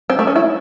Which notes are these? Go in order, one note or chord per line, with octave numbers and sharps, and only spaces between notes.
C4
A3
C#4
E4